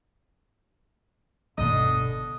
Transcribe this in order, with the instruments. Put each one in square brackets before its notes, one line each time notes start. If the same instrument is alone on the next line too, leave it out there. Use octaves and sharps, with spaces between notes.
[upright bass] G1 B2 [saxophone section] D3 D#5